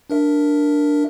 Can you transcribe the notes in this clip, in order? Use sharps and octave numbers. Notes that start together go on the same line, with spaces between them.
D4 A#4 E5